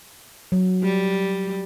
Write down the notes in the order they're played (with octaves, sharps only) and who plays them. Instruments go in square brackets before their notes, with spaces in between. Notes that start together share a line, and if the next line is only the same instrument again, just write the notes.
[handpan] F#3
[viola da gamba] G3